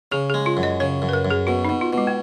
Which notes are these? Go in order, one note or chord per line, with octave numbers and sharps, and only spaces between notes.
C#3 G#4
G#3 G#4
F4
F#2
D#5
C#3 C#5
F#2
B4
A#4
F#2
G#4
B2 F#4
B2 D#4
F4
B2
G#3
B3